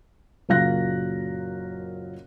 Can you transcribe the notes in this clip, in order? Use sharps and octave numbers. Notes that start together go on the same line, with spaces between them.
F#1 A#2 F#3 F5 F#6 A#6